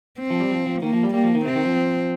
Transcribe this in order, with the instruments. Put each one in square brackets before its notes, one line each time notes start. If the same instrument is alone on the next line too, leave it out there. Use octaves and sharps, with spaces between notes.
[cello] C4
[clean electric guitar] F3
G3
F3
F3
[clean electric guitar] D#3 [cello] A#3
[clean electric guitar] F3
G3
[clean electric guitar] G3 [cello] A#3
[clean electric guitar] F3
D#3
[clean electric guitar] C3 [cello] C4
[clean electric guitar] D#3
F3